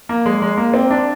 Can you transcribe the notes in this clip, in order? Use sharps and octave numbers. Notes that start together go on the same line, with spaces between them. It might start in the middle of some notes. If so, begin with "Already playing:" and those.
A#3
G#3
G#3
A#3
C4
D4